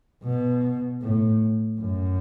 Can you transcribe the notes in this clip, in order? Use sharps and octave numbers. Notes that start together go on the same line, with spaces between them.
B2
A2
F#2